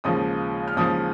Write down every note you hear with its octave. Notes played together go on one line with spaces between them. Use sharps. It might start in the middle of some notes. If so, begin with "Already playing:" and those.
D#2 C#3 F3 G#3 D#6
F6
D#2 C#3 F3 G#3 D#6